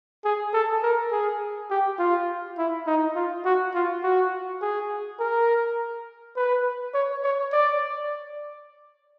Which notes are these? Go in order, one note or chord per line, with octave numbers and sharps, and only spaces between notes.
G#4
A4
A#4
G#4
G4
F4
E4
D#4
F4
F#4
F4
F#4
G#4
A#4
B4
C#5
C#5
D5